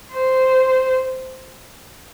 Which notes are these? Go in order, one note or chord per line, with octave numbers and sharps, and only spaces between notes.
C5